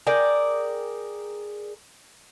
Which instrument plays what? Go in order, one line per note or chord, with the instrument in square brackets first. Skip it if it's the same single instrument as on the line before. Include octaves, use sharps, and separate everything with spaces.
[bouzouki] G#4 A#4 D5 G5